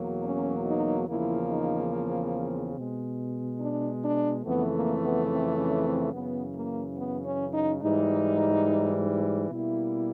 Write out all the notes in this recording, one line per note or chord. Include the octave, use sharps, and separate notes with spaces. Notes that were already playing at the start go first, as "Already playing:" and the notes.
Already playing: E2 B2 F#3 A#3
C#4
D#4
E2 C#3 F3 A#3 E4
D#4
C4
B2 G#3
D4
D4
F2 C#3 E3 A3 B3
A#3
B3
C4
C#4
C4
F#2 C#3 E3 B3
A#3
B3
C#4
D#4
G#2 E3 G3 D#4
B2 G3 A#3 E4